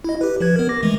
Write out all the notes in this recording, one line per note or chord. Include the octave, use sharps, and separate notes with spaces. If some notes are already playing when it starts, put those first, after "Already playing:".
E4 D#5
G4 B4
F3 B4 G#6
B3 A#4
D6 A#6
E3 G#3 A3